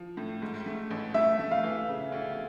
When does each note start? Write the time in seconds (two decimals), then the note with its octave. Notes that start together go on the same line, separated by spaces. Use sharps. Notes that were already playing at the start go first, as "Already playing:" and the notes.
Already playing: F3
0.17 A2
0.42 G#2
0.66 A3
0.91 A1
1.14 A3 E5
1.39 A3
1.51 F5
1.63 E3
1.88 C#3
2.12 D2